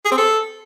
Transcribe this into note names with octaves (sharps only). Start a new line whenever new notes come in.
G#4
C4
A4